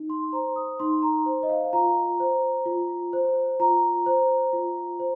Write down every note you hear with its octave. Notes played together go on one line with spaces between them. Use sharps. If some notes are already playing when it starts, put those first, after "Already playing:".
Already playing: D#4
C6
C5 A#5
D#6
D#4 C6
A#5
C5
D#5
F5
F4 A#5
C5
F4
C5
F4 A#5
C5
F4
C5